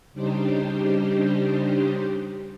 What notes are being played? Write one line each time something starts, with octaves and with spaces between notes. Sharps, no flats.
C#3 G3 D4 D#4 G4 C5